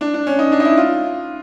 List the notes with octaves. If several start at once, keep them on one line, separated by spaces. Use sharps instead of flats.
D4
D4
C#4
D#4
D4
D#4
E4
F4